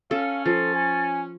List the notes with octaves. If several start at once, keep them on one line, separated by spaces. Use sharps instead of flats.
C#4 A4 F5
F3 A4 A6
G#5